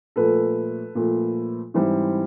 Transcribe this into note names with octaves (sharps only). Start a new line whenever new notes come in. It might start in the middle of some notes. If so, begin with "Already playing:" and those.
A#2 F3 A3 A4 B4
A#2 F3 A3
G#2 E3 G3 C4 E4